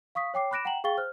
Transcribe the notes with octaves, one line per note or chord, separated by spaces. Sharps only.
F5 C#6 D#6 B6
C#5 G5 D6 C7
B5 D6 F#6 A#6 D7 E7
F#5 G5 A#5 E7 F#7
G#4 F5 G5 C#6 A6 G7
C5 F6 F#6